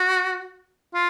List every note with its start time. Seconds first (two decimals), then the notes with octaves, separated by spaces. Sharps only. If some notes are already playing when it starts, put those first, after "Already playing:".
Already playing: F#4
0.94 F4